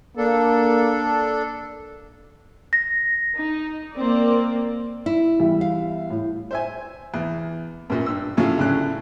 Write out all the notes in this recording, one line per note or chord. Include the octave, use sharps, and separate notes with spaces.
A#3 D4 A4
A#6
D#4
A#3 C4 D5
E4
E2 G3 E5
F5
A2
C5 E5 G#5
E2
F#2 A#2
G2 E6
A2 C#3 F#3 C#4 F4
D2 A2 C#3 C#4 F#6